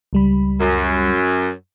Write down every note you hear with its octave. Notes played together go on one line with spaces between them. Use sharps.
C#2 G3 B5
F#2